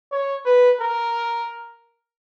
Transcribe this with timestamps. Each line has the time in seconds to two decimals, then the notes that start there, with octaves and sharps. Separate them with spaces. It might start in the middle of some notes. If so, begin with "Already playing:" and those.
0.12 C#5
0.46 B4
0.81 A#4